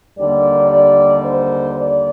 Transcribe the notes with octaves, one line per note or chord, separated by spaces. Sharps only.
D#2 D3 G3 A#3 D5
D5
C5
D5